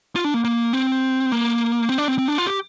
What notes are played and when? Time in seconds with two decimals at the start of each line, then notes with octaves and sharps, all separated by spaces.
0.15 F4
0.24 D4
0.34 A#3
0.44 A#3
0.73 C4
1.32 A#3
1.89 C4
1.98 D4
2.08 C4
2.18 C4
2.28 D4
2.38 F4
2.47 G4